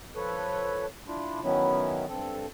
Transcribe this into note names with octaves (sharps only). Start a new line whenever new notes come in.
F3 A4 B4 C#5
D4 E4 F4
D#3 F#3 B3 C#4 E4
G2 C4 A4